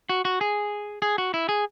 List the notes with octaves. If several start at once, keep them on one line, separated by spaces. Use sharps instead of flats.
F#4
F#4
G#4
G#4
F#4
E4
G#4